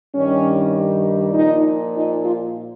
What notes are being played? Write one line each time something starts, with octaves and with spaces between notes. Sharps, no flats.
G2 D#3 G3 C#4
A#2 F3 D#4
D#4
F4